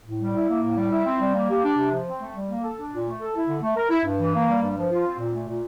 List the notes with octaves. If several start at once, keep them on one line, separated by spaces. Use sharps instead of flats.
A2
G3
E4
A#3
A2
G3
E4
C4
G3
A#3
G4
D4
C3
F3
C4
A3
G3
A#3
A4
D4
A#2
A3
A4
E4
D3
A3
A#4
E4
G2
E3
A#3
G3
G2
F3
F4
C4
A#2
A3
A#2